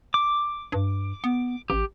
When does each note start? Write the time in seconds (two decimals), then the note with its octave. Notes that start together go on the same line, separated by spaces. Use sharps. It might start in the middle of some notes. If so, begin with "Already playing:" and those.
0.14 D6
0.72 G2
1.24 B3
1.70 A1 G4